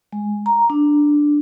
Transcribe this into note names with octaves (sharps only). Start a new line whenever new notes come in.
G#3
A#5
D4